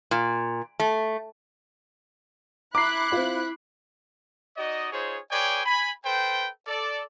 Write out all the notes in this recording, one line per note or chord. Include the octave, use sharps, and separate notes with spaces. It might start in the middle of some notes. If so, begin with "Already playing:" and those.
A#2
A3
E4 A#5 B5 D6 F#6 C7
C4 F4
D#4 F#4 D5 D#5
D#4 F4 G#4 C5 C#5
G#4 B4 C#5 D5 G5 G#5
G#5 B5
A4 B4 C5 G5
A4 D5